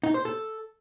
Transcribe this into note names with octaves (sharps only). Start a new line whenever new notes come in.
D#4
C5
A4